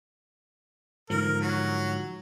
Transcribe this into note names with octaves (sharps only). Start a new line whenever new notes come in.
G#2 D3 F3 A#4
F#3